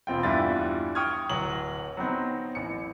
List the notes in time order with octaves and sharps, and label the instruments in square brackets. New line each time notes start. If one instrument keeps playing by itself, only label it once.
[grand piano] E1 C4 F4 G5
E2 G2 G3 E4 F4 A6
G5 C#6 D#6 F6 G#6
D1 F#3 F#7
F#3 B3 C4 D#4
A1 C#7